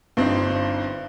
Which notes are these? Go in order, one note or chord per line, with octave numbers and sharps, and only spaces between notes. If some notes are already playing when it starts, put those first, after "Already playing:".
G1 G2 C4 D#4